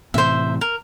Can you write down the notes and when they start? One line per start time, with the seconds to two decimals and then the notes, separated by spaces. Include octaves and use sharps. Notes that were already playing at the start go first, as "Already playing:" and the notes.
0.14 A2 C3 E3 C5 E5
0.61 A#4